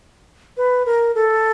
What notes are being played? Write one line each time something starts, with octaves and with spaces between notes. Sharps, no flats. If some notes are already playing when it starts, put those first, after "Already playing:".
B4
A#4
A4